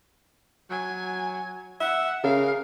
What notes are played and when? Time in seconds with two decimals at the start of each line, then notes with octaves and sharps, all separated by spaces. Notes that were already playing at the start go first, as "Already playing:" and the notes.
0.70 F#3 G#5
1.80 E5 F#5
2.24 C#3 A#4 F5